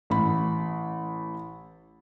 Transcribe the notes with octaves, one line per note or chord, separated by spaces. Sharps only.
A1 B5